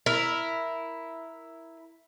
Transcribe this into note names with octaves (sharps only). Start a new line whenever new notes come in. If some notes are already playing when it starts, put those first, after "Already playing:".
E4 A#4